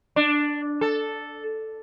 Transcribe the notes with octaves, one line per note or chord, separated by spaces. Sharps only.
D4
A4